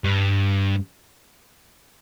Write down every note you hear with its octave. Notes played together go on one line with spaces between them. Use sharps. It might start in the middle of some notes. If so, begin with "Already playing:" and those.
G2